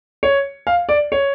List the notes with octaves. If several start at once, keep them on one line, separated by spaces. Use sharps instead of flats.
C#5
F5
D5
C#5